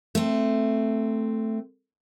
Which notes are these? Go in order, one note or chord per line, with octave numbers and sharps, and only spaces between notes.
A3 C4